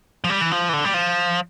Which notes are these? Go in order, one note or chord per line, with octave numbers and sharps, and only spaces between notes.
F3
G3
E3
F3
E3
D3
G3
F3